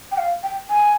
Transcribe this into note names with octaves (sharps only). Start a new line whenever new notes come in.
G5
F5
G5
G#5